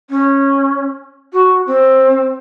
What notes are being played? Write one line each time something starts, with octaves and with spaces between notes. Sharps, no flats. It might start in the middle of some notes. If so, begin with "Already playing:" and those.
C#4
F#4
C4